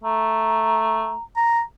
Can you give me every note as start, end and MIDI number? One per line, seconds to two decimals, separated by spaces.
0.04 1.14 57
0.04 1.23 82
1.36 1.62 82